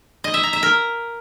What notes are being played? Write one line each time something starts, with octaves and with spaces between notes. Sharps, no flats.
D#5
E5
A#5
E5
A#4